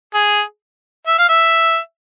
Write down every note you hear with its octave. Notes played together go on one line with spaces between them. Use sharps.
G#4
E5
F5
E5